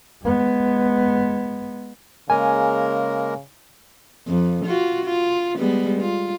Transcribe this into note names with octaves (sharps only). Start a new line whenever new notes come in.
G#3 B3
C#3 G#3 A#3 A#4 G#5
F2
F4 F#4
F4
G3 G#3 B3
F4